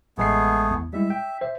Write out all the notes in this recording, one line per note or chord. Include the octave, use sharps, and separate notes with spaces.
A1 G#3 A3 B3 G#4 C7
E2
G3 G#3 E4 E5
G5
C5 E5